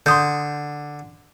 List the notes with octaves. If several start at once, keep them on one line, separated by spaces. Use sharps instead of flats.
D3 C6 D#6 G6